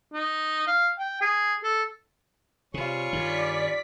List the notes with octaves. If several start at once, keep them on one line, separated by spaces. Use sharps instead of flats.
D#4
F5
G5
G#4
A4
C3 G3 F4 G#4 C#5 C#6
G2 D#3 D5 B6